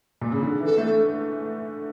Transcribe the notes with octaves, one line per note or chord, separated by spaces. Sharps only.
A#2
C#3
D3
E3
A4
A3